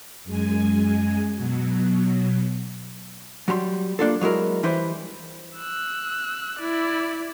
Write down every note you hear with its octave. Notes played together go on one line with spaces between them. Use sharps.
F#2 G#3 G#5
B2 F#3
F#3 G3 A#5 C6
A#3 D4 F4 A4
F#3 G#3 E4 A#4
E3 G3 E4 B4 C5
E6 F#6
E4 D5